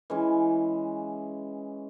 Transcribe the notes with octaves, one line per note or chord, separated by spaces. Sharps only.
E3 G#3 C#4